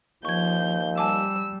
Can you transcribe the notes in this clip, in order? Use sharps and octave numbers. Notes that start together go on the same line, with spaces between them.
D#2 F3 C#6 G6 G#6
G3 G#5 A5 D6 E6